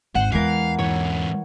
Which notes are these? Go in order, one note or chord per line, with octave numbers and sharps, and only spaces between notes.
G#1 D#2 C5 F#5
E2 E3 G#3 A#4 F5
G#2 E3 C#5